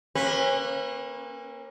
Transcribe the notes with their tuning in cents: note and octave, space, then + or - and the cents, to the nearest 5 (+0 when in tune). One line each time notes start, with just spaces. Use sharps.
A#3 +0 C#4 -40 B4 -5